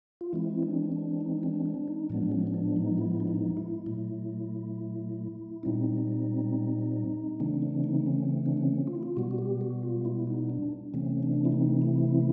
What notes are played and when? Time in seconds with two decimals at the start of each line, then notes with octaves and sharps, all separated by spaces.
0.21 F4
0.33 E3 G#3 C4 E4
0.63 D4
0.92 D4
1.21 D#4
1.43 D4
1.65 D4
1.88 D#4
2.10 A2 F3 G#3 B3 D4
2.23 D4
2.32 C#4
2.47 C#4
2.54 D4
2.76 D#4
2.98 E4
3.20 D4
3.27 D#4
3.57 E4
3.86 A#2 F#3 A3
5.63 A#2 G3 C4 D#4
7.40 C#3 E3 A3 C4 D4
7.62 D4
7.84 D#4
8.06 C#4
8.46 D4
8.57 C#4
8.87 F4
8.95 E4
9.03 F4
9.17 B2 G3 B3 F#4
9.31 F#4
9.38 G4
9.61 F#4
9.83 F4
10.05 E4
10.27 D#4
10.50 D4
10.94 C3 E3 A3 C4 C#4
11.23 D4
11.45 E4
11.52 D#4
11.82 E4